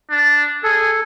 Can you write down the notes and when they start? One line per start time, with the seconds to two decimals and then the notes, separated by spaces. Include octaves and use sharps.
0.10 D4
0.64 G#4 A4